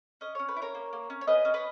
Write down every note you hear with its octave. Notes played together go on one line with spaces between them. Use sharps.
C#4 D#5
C#4 C#5
B4
E4
A#4 C#5
A#3
A#3
C#4
C#5
C#4 B4 D#5
C#4
B4 D#5